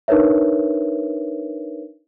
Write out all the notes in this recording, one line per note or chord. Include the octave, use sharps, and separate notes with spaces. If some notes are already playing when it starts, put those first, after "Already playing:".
D4 D#4 A#4 B4 C#5 E5